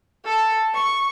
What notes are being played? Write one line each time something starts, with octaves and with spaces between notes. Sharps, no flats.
A4
C#6